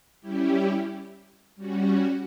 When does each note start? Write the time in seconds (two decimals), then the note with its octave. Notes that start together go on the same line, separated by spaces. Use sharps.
0.21 G3 C#4 E4 G4
1.56 G3 C#4 F#4